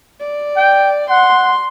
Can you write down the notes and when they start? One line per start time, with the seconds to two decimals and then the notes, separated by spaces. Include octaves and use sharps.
0.20 D5
0.57 G5
1.10 F#5 C6